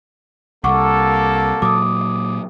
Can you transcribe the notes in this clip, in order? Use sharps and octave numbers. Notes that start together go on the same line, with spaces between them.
C2 A#3 A4 F#5 C#6 D6
A#2 F#3 D6 D#6